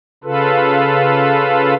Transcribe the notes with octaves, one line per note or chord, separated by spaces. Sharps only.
C#3 F4 A4 B4